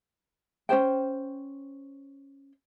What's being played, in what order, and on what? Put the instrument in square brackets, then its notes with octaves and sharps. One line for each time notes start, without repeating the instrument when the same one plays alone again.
[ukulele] C#4 G#4 C5 G5